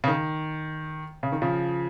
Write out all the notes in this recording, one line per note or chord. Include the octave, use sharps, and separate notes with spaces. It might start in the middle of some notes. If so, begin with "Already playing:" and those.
C#3
D#3
C#3
D#3
C#3 F3